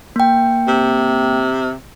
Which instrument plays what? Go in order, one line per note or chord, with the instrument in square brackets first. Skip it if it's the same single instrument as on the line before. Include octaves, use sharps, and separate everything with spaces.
[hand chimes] A#3 G5
[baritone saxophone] C3